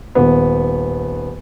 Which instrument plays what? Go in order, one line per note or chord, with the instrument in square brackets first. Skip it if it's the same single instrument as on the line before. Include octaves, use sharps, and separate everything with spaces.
[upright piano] D#1 B3